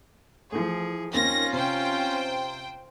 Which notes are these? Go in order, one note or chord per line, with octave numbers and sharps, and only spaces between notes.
E3 F3 A3 G#4
D#2 A#3 C4 C#4 F4 A#6
C3 C5 G5